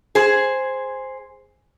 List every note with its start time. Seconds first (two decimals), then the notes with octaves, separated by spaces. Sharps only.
0.15 G#4 C5